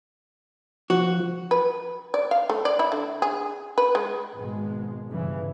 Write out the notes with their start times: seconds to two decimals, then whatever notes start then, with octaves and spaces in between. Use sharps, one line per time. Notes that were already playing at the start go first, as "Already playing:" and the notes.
0.90 F3 F#4
1.51 B4
2.14 D5
2.31 F5
2.49 A3
2.65 D5
2.79 E4
2.92 D3
3.22 G#4
3.78 B4
3.95 G#3
4.37 G#1 B2 G#3
5.09 G1 G2 C#3 E3